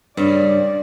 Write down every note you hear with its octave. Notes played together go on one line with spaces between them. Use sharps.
G2 C#3 D5